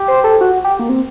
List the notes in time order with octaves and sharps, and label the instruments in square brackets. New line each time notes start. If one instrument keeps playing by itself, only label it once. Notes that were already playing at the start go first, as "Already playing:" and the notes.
Already playing: [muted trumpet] G4
[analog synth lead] C5
A4
F#4
G4
A#3
C4